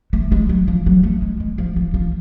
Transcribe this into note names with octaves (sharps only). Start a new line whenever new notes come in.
A3
G#3
F#3
F3
F#3
A3
G#3
G#3
F3
F3
F3